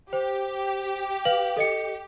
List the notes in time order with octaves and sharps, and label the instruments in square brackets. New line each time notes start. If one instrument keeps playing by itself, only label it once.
[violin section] G4 [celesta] C5
[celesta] B4 F5 F#7
A4 D#5 C#7